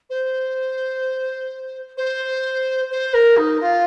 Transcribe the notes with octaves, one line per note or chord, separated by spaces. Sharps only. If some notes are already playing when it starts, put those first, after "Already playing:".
C5
C5
C5
A#4
D#4
F4